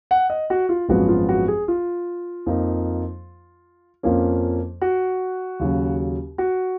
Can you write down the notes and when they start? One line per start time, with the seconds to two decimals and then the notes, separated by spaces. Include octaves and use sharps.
0.11 F#5
0.30 D#5
0.50 F#4
0.69 F4
0.89 G#1 F#2 F3 G#3 B3 F#4
1.09 F4
1.29 F#4
1.48 G#4
1.68 F4
2.46 F2 F3 A#3 D#4
4.03 F2 F3 A#3 C#4
4.81 F#4
5.60 D#2 C#3 F#3
6.38 F#4